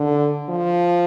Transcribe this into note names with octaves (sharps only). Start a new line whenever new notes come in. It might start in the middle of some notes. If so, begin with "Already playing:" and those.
Already playing: D3
F3